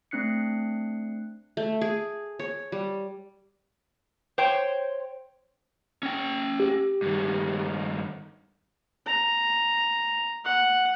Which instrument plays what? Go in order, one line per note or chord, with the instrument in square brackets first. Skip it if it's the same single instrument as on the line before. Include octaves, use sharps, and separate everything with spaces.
[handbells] A3 C4 D4 F#6 C7 C#7
[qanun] A3
G#4
C#5
G3
[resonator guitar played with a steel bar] C5 C#5 G5
[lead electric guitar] C#4 G5
[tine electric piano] G4
[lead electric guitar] G2 D#3
[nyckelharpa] A#5
F#5